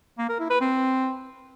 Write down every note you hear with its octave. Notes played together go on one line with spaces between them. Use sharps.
A#3
A#4
E4
B4
C4